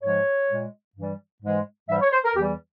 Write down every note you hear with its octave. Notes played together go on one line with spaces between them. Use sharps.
G#2 F3 G#3 C#5
A#2 G#3
G2 E3 G3
G#2 E3 G#3
G#2 E3 G3 E5
C#5
C5
A#4
E2 E3 G3 G4